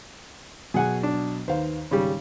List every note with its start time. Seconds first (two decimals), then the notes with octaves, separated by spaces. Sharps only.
0.74 B2 F#3 G#4 F#5 G#5
1.03 D4
1.48 D#2 B4 C5 F5
1.91 G#1 C#3 G3